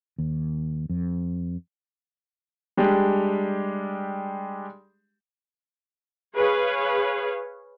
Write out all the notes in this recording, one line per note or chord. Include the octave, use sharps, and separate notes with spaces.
D#2
F2
G3 G#3 D4 G4
G#4 B4 C#5 F5